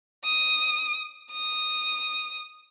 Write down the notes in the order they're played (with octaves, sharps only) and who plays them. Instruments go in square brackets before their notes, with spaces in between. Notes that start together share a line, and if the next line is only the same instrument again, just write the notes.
[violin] D#6
D#6